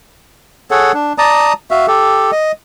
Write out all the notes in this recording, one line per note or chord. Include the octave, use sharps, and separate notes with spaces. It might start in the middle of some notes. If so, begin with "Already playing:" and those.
G#4 A4 C#5 F#5
D4
D5 A5 A#5 D#6
F#4 E5 F5
G4 A4
D#5